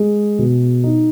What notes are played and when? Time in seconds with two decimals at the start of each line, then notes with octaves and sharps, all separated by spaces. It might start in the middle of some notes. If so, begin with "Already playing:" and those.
Already playing: G#3
0.39 B2
0.84 D#4